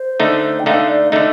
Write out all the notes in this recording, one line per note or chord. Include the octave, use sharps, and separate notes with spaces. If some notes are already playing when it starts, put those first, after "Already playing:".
Already playing: C5
D3 A3 D#4
G5
D3 A3 D#4 F5
D5
D3 A3 D#4 D#5